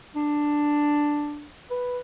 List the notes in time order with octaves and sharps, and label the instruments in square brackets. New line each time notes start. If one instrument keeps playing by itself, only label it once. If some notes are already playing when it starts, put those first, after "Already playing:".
[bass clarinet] D4
B4